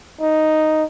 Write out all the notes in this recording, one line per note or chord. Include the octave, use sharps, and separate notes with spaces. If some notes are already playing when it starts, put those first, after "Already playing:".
D#4